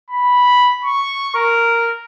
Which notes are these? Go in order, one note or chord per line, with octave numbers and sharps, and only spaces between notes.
B5
C#6
A#4